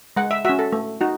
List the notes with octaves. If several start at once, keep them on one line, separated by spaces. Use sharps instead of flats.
G#3 F#5
E5
C#4 F#4 E5
A4
A3
D#4 F#4